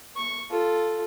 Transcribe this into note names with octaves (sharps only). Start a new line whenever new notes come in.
C#6
F4 A4